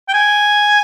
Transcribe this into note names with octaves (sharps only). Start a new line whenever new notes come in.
G5
G#5